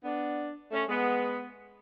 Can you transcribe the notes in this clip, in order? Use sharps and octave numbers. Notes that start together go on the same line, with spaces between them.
B3 D4
A3 C#4
G#3 B3